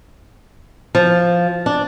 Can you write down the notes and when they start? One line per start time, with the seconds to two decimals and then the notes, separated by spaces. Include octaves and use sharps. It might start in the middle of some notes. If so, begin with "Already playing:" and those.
0.95 F3
1.66 D4